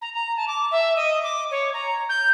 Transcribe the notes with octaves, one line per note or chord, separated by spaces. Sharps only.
A#5
A#5
A5
D6
E5
D#5
D6
C#5
A#5
G6